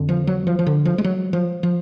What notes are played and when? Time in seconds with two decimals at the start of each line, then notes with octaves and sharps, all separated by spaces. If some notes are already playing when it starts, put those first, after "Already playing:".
Already playing: F2 D3
0.09 F3
0.27 F#3
0.47 F3
0.59 F3
0.67 D3
0.85 F3
0.98 G#3
1.04 F#3
1.33 F3
1.63 F3